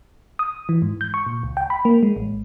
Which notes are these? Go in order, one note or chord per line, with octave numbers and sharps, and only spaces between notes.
D#6
E3
G#2
G6
C#6
A#2
C#2
G5
B5
A#3
G#3
A1